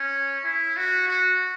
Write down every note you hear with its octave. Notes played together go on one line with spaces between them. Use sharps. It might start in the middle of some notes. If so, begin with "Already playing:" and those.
Already playing: C#4
E4
F#4
F#4